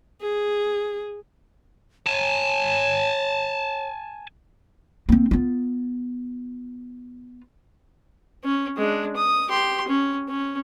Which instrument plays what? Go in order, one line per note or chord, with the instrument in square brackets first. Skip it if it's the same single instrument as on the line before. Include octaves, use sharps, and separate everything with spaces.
[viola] G#4
[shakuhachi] C#5 [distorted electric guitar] G#5 A5
[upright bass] A#3 C4
B3 F4
[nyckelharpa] C#4
G#3 D4
D#6
G4 C6
C#4
C#4